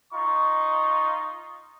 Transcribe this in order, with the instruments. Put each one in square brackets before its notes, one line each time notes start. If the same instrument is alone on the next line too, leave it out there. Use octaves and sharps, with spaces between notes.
[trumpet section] D#4 F4 D#5 C#6